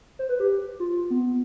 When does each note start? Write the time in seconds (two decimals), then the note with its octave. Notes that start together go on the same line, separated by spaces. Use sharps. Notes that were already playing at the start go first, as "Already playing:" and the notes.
0.19 C5
0.29 B4
0.40 G4
0.80 F4
1.10 B3